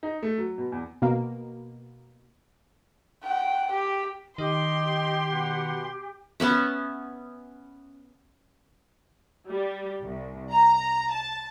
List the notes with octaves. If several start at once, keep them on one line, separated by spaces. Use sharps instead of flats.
D#4
A3
F#3
B2
E2
B2 A#3
F#5 G5
G4
D#3 G4 D#5 C6
B2 F#5
B3 C#4 E5
G3
C2
A#5
A5